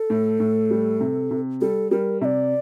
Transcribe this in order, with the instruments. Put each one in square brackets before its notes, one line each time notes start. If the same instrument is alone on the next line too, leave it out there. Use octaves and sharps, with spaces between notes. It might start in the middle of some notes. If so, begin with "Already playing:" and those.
Already playing: [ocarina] A4
[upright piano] A2
A2
G3
C3
C3
[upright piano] G3 [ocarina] A4
[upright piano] G3 [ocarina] A#4
[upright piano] C3 [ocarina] E5
[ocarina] D5